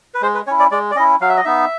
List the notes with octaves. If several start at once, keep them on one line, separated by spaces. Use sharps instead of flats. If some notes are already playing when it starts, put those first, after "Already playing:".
B4
G#3 C5
B4
C#4 E4 C#5
D5
G#3 D5
D5
C#4 E4 D#5
F#3 F5
E5
D#5
B3 D#4 E5